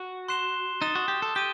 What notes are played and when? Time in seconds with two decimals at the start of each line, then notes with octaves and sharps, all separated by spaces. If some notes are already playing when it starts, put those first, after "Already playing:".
Already playing: F#4
0.28 C6 F#6 C7 E7 G7
0.82 D#4 D#6 A6 E7 G7
0.95 F#4
1.08 G4
1.22 A4
1.35 G4 D#7 G7